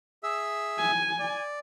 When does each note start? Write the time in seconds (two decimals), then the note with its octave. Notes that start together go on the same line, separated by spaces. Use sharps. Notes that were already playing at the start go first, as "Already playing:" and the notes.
0.23 G#4 E5 E6
0.79 G#5
1.19 D5